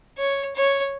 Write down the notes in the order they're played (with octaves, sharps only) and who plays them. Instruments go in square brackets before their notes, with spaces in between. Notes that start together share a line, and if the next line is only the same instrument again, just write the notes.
[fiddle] C#5
C#5